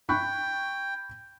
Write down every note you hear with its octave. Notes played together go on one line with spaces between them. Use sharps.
G5 B5 C#6 F#6